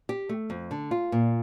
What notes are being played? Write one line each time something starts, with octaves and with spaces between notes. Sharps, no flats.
G4
A3
F2
D3
F4
A#2